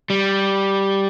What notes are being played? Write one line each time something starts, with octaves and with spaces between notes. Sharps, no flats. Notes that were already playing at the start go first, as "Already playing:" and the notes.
G3